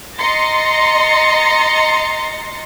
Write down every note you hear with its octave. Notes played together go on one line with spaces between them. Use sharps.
D#5 A#5 C6 A6 A#6 C#7